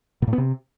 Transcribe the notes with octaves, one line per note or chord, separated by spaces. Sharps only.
A#2
A2
B3
C3